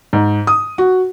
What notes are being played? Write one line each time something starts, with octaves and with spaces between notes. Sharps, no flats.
G#2
D#6
F#4